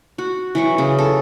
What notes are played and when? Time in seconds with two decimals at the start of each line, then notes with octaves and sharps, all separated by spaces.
0.18 F#4
0.55 E3 F#3 C#6
0.78 C#3
0.98 A4